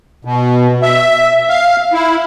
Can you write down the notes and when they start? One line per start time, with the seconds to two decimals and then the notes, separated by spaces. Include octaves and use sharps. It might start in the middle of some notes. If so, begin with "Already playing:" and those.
0.25 B2
0.82 E5
1.49 F5
1.93 E4